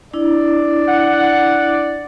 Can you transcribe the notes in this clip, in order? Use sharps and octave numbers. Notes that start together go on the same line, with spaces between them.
D4 E4 D5
F#5